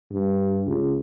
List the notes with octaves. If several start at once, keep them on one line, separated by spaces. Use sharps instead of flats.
G2
C#2